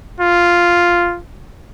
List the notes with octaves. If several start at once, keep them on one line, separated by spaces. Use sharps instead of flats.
F4